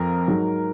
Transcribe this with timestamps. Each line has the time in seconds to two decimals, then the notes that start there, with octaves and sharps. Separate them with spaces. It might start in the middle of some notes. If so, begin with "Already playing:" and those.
Already playing: F2 F3 A#4
0.28 G#2 F#3